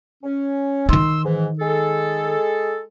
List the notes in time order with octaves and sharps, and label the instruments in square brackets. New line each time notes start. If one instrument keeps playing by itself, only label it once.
[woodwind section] C#4
[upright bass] D#3 D#4 [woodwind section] C6 E6
[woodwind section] G#2 E3
G#3 G#4 A4